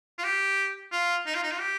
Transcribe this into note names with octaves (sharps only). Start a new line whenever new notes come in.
F4
G4
F4
D#4
F4
D#4
F4
G4